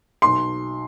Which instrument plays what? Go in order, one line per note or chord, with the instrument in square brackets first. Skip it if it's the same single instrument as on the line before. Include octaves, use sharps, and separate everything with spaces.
[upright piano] B1 C6